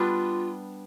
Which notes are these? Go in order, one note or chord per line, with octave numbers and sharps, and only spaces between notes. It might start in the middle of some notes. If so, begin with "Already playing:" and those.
Already playing: G3 B3 D4 F4